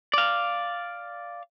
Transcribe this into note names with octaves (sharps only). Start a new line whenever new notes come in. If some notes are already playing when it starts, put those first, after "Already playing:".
D5 F5